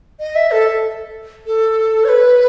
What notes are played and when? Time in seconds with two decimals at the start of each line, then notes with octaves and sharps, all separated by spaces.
0.20 D#5
0.35 E5
0.51 A4
1.46 A4
2.04 C#5
2.09 B4